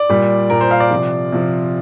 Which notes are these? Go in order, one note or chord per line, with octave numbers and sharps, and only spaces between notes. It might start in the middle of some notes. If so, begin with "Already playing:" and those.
Already playing: D5
A#2 G3
A#2 G3 A#4
C5
F5
D5
C3 F3
C3 F3